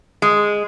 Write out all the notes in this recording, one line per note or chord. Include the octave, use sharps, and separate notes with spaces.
G#3